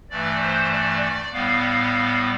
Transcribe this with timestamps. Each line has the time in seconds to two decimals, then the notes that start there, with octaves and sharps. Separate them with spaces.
0.10 G2 E3 A3 D5
0.40 C5
0.72 D5
1.02 D5
1.32 A2 G3 B3 F5